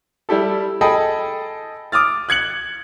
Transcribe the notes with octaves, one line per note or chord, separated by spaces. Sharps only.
G3 E4 G4 A4
G#4 A4 D#5 G5 B5
D6 D#6 F6 A6
F#6 G#6 C#7 F#7